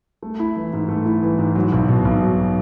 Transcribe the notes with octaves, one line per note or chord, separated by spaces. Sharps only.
A3
E4
E3
G#2
A3
E4
E3
G#2
F#3
B1
B2
B1
F#3